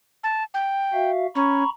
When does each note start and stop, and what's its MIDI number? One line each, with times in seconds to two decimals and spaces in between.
0.24 0.43 81
0.54 1.10 79
0.93 1.27 66
0.93 1.27 76
0.93 1.27 77
1.35 1.63 61
1.35 1.69 82
1.35 1.69 83
1.35 1.69 85